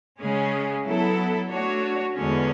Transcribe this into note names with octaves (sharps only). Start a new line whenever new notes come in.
C#3 G#3 C#4 G#4
F#3 B3 E4 A4
A3 D4 F#4 C#5
E2 D3 G#3 C#4